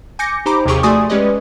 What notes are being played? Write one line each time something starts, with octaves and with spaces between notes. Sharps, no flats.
G#5 D6 G6 A#6 C#7
D#4 G4 C5 A#5 B5 D6
D#2 C3 F3 G4 G#4 C#6
A3 F#4 D5 G#5 C6 D#6
G#3 C#4 G4 B4 D5 D#5